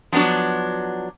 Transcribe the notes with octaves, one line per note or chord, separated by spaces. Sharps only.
F3 F#3 B3 D4 F#4